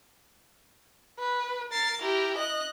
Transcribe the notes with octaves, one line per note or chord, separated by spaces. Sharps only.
B4
A#4 A6 C7
E4 G4 A#4
D#5 F#6